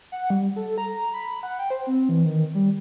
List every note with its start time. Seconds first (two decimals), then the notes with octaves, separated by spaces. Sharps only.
0.12 F#5
0.30 G3
0.56 A4
0.78 A#5
1.13 B5
1.43 F#5
1.59 G5
1.70 C5
1.87 C4
2.09 E3
2.25 D#3
2.55 G3